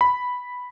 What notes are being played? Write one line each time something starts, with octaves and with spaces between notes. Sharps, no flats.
B5